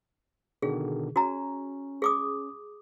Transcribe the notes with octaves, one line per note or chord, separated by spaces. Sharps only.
B2 D3 D#3 G#4
C#4 F#4 A#5
G#4 D6 D#6